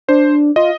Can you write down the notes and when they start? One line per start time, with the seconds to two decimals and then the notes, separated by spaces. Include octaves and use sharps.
0.08 D4 C5
0.56 F4 D#5